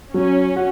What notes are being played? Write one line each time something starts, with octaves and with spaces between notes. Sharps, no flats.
F#3 C#4
F#4